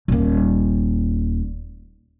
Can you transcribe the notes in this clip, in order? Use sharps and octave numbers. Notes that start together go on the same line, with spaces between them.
D#1 A#3